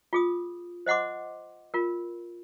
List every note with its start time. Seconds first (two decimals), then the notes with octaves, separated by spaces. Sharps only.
0.13 F4 G#4 D#6
0.86 C5 D#5 F#5 C6 D6
1.74 F4 A#4